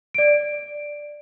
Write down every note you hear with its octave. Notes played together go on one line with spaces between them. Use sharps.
D5 D7